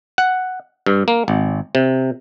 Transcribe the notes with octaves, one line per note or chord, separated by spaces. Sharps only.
F#5
G2
A#3
G#1
C3